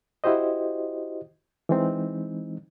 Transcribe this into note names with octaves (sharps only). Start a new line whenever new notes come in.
E4 F#4 G4 C5 D#5
E3 G#3 C4 D#4